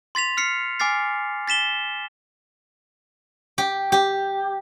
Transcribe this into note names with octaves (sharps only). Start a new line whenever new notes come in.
C6 A6 B6 F7
F6 C7 C#7
G#5 D6 F6 A6 C7
A6 B6 E7 G7
G4
G4